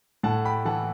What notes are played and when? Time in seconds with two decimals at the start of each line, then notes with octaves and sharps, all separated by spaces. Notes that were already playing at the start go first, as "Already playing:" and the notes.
0.23 A2 F#5 A5
0.45 G5 B5
0.65 E3 F#5 A5